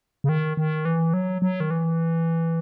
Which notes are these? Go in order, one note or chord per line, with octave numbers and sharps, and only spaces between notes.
C#3
D#3
D#3
E3
F#3
F#3
D#3
E3